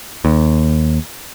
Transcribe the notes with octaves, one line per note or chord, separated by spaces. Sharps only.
D#2